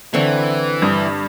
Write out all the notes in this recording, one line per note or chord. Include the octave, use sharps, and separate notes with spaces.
D3 E3 C4 C#6
G2 D#6